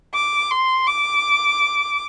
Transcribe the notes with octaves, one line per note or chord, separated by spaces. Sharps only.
D6
C6
D6